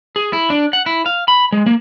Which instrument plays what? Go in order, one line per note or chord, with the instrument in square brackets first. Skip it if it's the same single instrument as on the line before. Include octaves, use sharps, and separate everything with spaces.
[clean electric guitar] G#4
E4
D4
F#5
E4
F5
B5
G#3
A#3